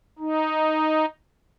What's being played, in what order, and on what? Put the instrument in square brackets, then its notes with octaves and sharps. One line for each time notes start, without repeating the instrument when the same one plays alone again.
[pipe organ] D#4